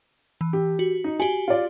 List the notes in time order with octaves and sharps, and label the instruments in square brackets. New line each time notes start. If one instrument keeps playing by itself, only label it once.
[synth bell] E3
[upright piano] G4
[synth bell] F#4
[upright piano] D#4
[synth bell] F#4 G4 [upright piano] G#5
[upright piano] F4 D5